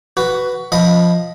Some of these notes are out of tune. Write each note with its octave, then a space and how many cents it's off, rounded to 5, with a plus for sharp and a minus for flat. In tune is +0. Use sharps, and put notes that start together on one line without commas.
F#4 +15 B4 +0
F3 +0 D#5 +10 B5 +0